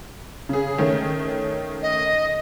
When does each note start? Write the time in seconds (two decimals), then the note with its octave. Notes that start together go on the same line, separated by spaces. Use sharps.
0.49 C#3 G#4
0.78 D#3 A3 C#4
1.82 D#5